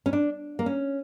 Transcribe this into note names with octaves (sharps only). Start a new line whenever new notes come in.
C#4
D4
A#3
C#4